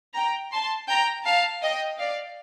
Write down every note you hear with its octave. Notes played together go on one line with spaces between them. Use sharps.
G5 A#5
A5 C6
G5 A#5
F5 A5
D#5 G5
D5 F5